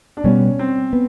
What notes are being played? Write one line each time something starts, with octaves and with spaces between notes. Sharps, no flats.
D4
B2 G3 B3 C#4
C4
B3